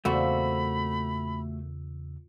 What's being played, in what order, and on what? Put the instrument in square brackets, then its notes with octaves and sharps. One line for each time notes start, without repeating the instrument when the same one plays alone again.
[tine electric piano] E2 C#3 E6 [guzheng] A#2 C4 [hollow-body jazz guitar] A3 F#4 [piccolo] B5